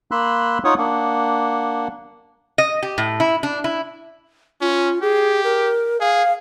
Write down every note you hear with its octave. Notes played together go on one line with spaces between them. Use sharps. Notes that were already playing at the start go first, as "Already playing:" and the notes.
A#3 B5 C6 E6 F#6
D#4 F4 C#5 F#5 C#6 D#6
A#3 D4 F#5
D#5
G4
A2
E4
D4
E4
C#4 F4
G4 G#4
A#4
G#4 F5